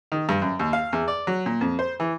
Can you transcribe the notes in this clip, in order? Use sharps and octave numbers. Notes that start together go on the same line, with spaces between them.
D#3
G2
F#2
D#2
F5
E2
D5
F#3
A#2
F2
C5
E3